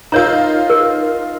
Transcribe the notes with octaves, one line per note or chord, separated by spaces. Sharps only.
D#4 F4 A#4 C#5 A#5
A#4